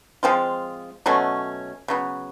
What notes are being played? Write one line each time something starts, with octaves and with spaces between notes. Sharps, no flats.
F3 G#3 C4 F4
B2 F#3 A3 C#4
C#3 F#3 B3